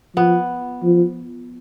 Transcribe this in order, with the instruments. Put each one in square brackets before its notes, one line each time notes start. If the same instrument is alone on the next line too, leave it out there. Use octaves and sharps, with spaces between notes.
[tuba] F3 [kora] B3
[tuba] F3